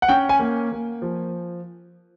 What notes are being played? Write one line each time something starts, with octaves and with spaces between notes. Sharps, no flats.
F#5
C#4 G5
G#5
A#3
A#3
F3